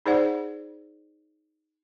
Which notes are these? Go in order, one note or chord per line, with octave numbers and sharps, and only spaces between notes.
D#4 G#4 C5 D5 F#5